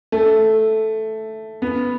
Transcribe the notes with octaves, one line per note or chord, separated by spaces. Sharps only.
A3
B3